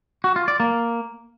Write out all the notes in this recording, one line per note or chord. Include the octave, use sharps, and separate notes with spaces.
F#4
F4
D5
A#3